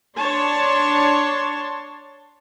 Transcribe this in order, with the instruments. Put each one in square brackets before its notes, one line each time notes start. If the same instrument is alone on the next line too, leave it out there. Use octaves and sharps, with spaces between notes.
[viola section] D4 C#5 A5 C6